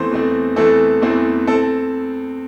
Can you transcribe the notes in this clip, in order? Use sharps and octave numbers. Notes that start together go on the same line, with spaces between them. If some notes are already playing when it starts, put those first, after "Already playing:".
Already playing: E2 E3 A3 C4 C5
E2 E3 A3 C4
E2 E3 A3 C4 A4
E2 E3 A3 C4
C4 A4